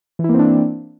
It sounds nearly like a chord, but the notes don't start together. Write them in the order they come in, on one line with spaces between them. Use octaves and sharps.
E3 E4 A#3 C4 D4